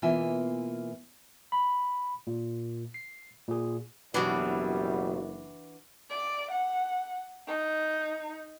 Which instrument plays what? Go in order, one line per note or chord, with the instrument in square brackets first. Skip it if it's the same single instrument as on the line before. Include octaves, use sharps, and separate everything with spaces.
[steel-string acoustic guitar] B2 E3 A#3 F4 E5 G#5
[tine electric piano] B5
A#2
C7
A#2 G#4
[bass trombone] F#1 [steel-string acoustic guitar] B2 F#3 [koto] E3 D4 F#4 [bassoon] G3
[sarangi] D5
F#5
D#4